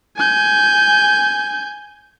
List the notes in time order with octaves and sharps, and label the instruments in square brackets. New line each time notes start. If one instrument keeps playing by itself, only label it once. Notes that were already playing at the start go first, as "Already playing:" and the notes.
[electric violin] G#5 G6